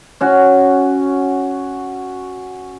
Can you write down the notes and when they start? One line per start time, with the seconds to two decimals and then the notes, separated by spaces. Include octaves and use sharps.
0.21 C#4 F#4